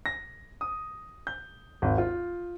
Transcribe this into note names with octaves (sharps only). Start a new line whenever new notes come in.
A#6
D#6
G6
G#1
F4